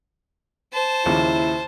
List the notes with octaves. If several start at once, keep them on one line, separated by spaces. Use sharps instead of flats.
C5 A5
A#1 D#2 C#3 E4